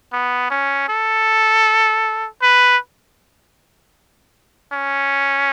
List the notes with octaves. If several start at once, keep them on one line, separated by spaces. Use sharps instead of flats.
B3
C#4
A4
B4
C#4